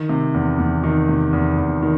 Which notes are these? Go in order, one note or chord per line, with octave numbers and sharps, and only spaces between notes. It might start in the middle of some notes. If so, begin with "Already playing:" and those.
Already playing: D#3
C3
E2
E2
D#3
C3
E2
E2
D#3